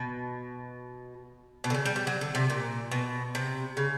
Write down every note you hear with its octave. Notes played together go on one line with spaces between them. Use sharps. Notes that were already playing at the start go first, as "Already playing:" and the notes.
Already playing: B2
B2
D3
C#3
G3
G3
F#3
D3
C3
A#2
B2
C3
C#3